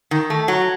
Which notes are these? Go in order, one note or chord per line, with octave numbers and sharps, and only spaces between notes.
D#3
A3
F#3